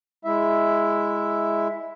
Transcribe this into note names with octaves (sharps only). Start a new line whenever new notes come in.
G#3 E4 E5